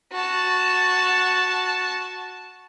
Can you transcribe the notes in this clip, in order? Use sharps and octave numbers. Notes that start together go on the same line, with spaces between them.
F#4 A5